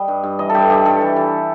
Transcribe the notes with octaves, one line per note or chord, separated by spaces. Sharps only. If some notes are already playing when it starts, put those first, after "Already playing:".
Already playing: G3 D#5 B5
G2
G2
E3 D#5
A4
G2 G4
G2 G4
G2 A4
E3
E3